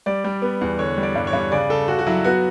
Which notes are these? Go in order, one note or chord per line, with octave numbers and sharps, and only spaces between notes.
G3 D5
G3
B3
E2
D3 C#5
G3
D5
G2
C#5
G2
C#3 D5
C#3 A4
C#3 F#4
F#4
F#3 E4
B3 F#4